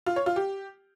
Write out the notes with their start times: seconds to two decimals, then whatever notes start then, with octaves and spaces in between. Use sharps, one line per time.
0.06 F4
0.16 C#5
0.26 F4
0.36 G4